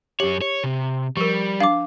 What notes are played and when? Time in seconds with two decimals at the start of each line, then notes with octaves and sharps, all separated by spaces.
0.20 F#2 G4 C#5 F#7
0.42 C#5
0.64 C3
1.17 F3 G3 A#4
1.60 D4 F5 D6